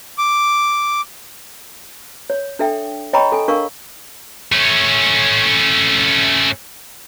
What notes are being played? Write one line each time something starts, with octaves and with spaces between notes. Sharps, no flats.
D6
C#5
D4 A4 E5 G5
C#5 D#5 G5 A#5 B5 C#6
A4 G#5
D4 A#4 F5 C#6
A3 C#4